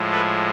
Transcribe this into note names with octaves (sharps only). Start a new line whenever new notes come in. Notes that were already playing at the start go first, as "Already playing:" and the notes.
Already playing: A2 F3 G#3
A4 B4